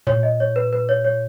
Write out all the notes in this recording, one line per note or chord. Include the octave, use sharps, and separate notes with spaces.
A#2 C#5
D#5
C#5
B4
B4
C#5
C#5